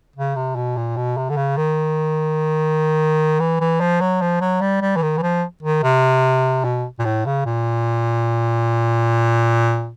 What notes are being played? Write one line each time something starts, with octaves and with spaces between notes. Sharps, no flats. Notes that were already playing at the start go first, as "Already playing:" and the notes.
C#3
C3
B2
A#2
B2
C3
D3
C#3
D#3
E3
E3
F3
F#3
F3
F#3
G3
G3
E3
D#3
E3
F3
D#3
C3
B2
A#2
A2
C#3
A#2